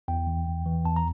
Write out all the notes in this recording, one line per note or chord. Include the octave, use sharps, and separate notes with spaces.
E2 G5
E3
E2
E3
E2 A5
A#5